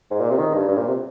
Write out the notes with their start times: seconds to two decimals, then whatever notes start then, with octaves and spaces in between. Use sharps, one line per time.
0.11 G#2
0.20 A#2
0.30 C3
0.38 D#3
0.54 G2
0.68 G2
0.77 A#2
0.87 C3